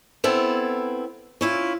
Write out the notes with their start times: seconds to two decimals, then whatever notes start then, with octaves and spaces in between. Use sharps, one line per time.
0.24 B3 C4 E4 A4
1.41 C#4 E4 F4